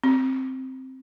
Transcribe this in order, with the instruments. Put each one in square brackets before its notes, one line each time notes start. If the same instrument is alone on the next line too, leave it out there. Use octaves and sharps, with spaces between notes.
[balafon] C4